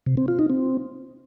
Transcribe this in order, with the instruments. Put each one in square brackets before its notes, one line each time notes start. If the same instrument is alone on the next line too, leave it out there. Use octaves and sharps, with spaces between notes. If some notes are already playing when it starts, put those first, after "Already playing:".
[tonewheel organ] C3
C4
F4
D#4
C4